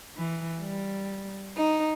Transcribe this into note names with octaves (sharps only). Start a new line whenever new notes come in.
E3
G3
D#4